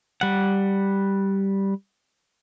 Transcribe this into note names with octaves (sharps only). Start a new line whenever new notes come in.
G3 F#5